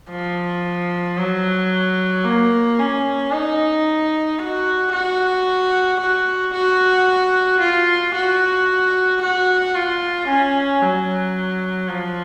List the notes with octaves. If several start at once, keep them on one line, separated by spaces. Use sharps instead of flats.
F3
F#3
A#3
C#4
D#4
F#4
F#4
F#4
F#4
F4
F#4
F#4
F4
C#4
F#3
F3